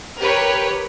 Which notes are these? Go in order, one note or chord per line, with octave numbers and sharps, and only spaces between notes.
G4 A#4 B4 C#5